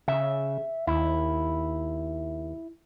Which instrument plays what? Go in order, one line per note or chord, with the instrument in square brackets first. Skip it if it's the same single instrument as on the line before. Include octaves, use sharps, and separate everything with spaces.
[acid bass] C#3 [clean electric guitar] E5
[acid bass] D#2 [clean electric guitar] E4